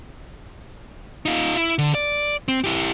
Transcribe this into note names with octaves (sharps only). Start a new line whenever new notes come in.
D#4 F4
E4
D3
D5
C4
E4 G4